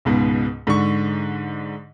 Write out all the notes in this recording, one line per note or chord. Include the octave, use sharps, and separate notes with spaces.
C#2 G#2 B2
G#2 D3 C#6